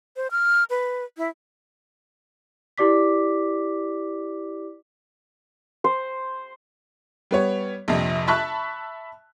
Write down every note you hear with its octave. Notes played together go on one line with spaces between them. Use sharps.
C5
F6
B4
E4
E4 G4 D5 D6 B6
C5
G3 B3 C#5
A#1 F2 C3
E5 A5 B5 C#6 F#6